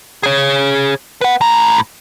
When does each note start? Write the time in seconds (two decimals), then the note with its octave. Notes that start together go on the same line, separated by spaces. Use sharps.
0.23 G#4 C#5
1.21 B4 F#5
1.41 A2 A#5